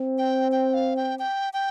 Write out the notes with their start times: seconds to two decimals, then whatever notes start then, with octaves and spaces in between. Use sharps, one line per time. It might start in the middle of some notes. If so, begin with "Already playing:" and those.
Already playing: C4
0.18 G5
0.52 G5
0.74 F5
0.96 G5
1.19 G5
1.53 G5